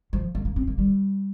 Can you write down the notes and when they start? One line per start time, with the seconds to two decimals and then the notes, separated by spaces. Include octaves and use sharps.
0.13 F3
0.35 A#3
0.45 A#3
0.56 C4
0.67 A#3
0.78 G3